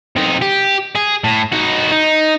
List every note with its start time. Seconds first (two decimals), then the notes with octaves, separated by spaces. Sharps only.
0.16 C3 D#4
0.42 G4
0.96 G#4
1.24 A2
1.52 D#4 F#4
1.91 D#4